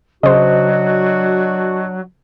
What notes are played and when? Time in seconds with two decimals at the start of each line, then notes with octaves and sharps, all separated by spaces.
0.23 C#3 F#3 D4 F#4 C5 D#5